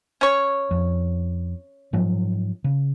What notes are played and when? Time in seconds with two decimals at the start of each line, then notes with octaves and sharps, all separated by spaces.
0.21 C#4 C#5
0.71 F2
1.93 G#2 F3 F#3
2.64 C#3